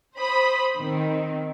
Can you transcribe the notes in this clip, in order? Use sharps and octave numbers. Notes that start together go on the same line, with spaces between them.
C5 B5 D#6
D#3 C4